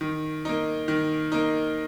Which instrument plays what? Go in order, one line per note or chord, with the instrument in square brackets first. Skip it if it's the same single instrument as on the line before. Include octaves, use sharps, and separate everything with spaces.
[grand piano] D#3
A#3 D#4
D#3
A#3 D#4